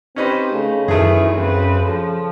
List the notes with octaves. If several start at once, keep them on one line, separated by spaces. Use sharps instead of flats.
C4 C#4 D#4 G4 B4 C5
C#3 A3
F#2 D#3 E3 A3 G#4
C#3 C4 B4
F3 A4